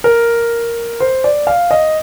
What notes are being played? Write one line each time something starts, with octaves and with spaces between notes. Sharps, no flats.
A#4
C5
D5
F5
D#5